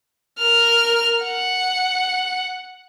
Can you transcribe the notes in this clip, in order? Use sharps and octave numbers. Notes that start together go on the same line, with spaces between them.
A#4 F6
F#5